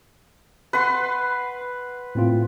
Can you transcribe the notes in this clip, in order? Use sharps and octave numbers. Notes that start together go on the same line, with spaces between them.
B4 F#5 C6
A2 C4 F4